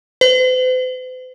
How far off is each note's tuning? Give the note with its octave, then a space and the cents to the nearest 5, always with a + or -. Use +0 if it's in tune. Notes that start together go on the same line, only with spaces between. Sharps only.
C5 -45